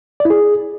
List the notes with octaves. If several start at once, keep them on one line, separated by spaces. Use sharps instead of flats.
D5
E4
G#4